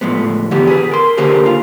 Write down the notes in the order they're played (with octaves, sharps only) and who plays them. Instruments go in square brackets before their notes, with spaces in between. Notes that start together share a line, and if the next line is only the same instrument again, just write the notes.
[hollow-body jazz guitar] A2 F3 G#3 B3
D3 E3 B3 G4
G#4 B4
A#4 C6
D3 A#3 G4 G#4 A#4 C5
F4